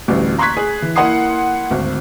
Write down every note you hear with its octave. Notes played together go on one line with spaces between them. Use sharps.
A1 D2 G3
A#5 C6 C#6 F#6 G#6 B6
G#4
E3
A#3 E4 F#5 C6 D#6 C7
G#1 D2